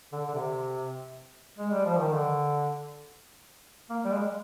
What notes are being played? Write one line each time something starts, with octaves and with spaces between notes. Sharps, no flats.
D3
D3
C3
G#3
G3
F3
D#3
D3
A#3
G3
G#3